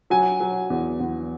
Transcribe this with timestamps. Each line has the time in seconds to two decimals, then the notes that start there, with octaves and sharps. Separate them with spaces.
0.10 F#3 G#5
0.40 F#3
0.70 E2
1.00 E2